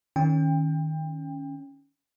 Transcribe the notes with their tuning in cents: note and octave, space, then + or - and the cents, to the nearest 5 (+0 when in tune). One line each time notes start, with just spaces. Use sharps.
D#3 +0 C#4 +0 G5 +25